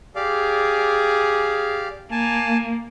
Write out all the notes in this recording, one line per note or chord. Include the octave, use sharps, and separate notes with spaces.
G4 G#4 D5 F5
A#3 G#5 A5